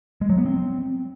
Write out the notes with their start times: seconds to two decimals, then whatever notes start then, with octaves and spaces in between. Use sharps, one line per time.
0.21 G#3
0.30 F#3
0.38 B3
0.46 C4